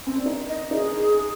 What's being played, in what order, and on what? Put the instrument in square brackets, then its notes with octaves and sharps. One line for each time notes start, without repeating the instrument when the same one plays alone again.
[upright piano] C4
D4
D#4
[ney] D#5
[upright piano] D#4 [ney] G#4